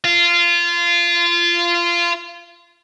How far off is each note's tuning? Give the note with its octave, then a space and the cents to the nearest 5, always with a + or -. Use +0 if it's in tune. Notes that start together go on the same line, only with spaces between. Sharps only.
F4 -20